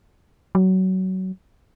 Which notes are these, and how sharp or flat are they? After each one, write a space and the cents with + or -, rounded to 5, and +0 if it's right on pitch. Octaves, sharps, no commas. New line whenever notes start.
F#3 +20